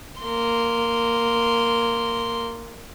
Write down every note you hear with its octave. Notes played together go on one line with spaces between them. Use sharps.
A#3 C6